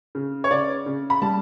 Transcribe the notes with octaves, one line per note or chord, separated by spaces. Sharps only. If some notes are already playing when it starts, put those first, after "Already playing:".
C#3
C#5
C#3 D5
C#3
B5
G3 A5